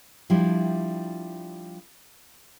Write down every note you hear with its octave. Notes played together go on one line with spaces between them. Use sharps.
F3 G3 D4 E4 G4